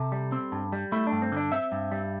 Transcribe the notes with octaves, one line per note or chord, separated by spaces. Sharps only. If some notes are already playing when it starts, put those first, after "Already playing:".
Already playing: C3 A4
G3
C4
G2
G3
A3 E4
D4
G2
C4
D3 D4
C4 E5
G2
G3